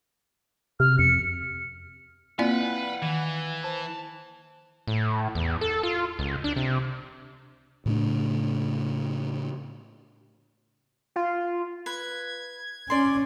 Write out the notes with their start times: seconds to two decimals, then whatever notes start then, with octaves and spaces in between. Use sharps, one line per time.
0.80 C3 F6
0.99 F2 C#7
2.39 A#3 C4 E4 F4 B4 D5 F5 F#5
3.02 D#3 E3
3.64 C5 A5
4.88 A2
5.35 E2
5.61 A4
5.83 F4
6.19 C#2
6.44 D4
6.56 C3
7.86 A2 C#3 A3 D4
11.16 F4
11.86 B4 G#6
12.90 C#4 D5 C6